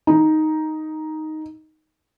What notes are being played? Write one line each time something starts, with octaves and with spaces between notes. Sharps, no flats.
D#4